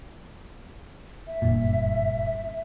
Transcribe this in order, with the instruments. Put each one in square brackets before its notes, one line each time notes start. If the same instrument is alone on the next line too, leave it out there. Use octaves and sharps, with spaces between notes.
[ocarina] E5
[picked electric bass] F#1 G2 A#2